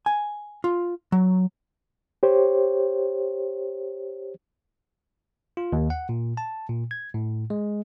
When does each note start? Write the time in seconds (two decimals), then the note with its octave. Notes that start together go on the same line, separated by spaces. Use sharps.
0.06 G#5
0.64 F4
1.12 F#3
2.23 G4 C5 C#5
5.57 F4
5.73 D#2
5.90 F#5
6.09 A#2
6.37 A5
6.69 A#2
6.91 G#6
7.14 A2
7.50 G#3